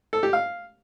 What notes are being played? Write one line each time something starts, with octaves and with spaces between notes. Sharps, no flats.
A4
G4
F5